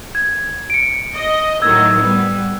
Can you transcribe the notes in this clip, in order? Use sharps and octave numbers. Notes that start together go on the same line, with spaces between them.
G#6
C#7 D7
D#5
A2 D#3 F#3 E6 G#6
G3 B3